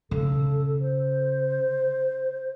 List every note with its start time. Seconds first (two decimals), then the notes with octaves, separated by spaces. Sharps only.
0.11 C#3 A4
0.80 C5